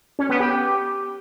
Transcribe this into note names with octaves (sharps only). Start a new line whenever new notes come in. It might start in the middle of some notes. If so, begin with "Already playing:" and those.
C#4
B3
G4